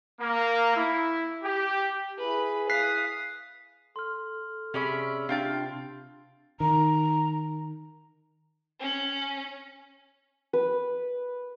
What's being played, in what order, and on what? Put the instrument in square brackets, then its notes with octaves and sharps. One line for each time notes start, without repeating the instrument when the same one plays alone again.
[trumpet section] A#3
E4
G4
[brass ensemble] E4 G#4 [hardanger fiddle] B4
[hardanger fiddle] F5 D#6 [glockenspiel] F#6 B6 C7
[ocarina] A4 [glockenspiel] C6 F6
[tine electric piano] C3 G#4 B5 [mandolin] C#4 D5 E5
[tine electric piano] C3 [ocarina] D4 [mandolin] F4 G5 A5
[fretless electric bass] D#3 [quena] A#5
[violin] C#4
[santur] B4